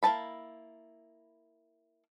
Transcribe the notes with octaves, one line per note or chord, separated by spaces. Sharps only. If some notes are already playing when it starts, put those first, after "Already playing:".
A#3 E4 B4 A5 B5